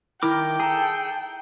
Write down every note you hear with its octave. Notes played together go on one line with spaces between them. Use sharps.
D#3 E4 A#4 G5 D6
G#4 A4 A#5